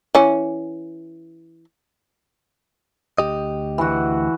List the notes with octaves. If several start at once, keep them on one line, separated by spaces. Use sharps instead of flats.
E3 C#4
D2 G4 D#5
E3 F#4